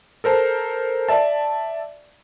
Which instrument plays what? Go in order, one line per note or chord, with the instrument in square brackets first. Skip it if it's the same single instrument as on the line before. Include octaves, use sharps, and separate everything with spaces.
[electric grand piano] A4 A#4 C5 A5
D5 E5 A5